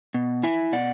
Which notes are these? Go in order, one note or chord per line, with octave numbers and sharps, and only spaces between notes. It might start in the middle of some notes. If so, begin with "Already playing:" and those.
B2
E4 E5 G#5
B2 D5 F#5